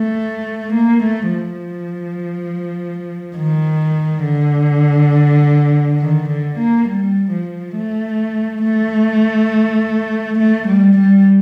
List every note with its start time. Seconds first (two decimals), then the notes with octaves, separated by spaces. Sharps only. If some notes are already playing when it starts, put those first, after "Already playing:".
Already playing: A3
0.74 A#3
1.04 A3
1.33 F3
3.37 D#3
4.25 D3
6.01 D#3
6.29 D3
6.59 A#3
6.89 G3
7.31 F3
7.76 A3
8.64 A3
10.39 A3
10.68 G3
10.98 G3